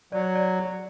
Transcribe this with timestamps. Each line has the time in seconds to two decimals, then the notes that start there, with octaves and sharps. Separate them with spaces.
0.12 F#3 D5
0.35 D5